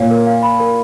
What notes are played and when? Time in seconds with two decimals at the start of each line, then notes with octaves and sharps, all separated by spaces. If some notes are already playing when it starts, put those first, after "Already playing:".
Already playing: A#2 C#5 F5
0.11 A#4
0.27 F5
0.43 B5
0.60 A#4